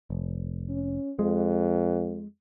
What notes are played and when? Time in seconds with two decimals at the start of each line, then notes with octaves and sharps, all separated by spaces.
0.10 F1
0.69 C#4
1.19 F2 G#3